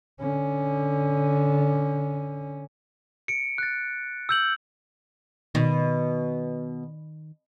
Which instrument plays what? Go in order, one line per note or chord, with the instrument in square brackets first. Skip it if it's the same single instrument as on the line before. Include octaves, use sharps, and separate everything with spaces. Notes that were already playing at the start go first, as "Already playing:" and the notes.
[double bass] D3 C#4
[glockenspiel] C#7 D7
F#6 A6
E6 G6 F#7
[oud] B2 [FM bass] D#3